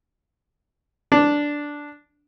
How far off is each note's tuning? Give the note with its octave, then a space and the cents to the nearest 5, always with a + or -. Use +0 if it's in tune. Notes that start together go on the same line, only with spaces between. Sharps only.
D4 -5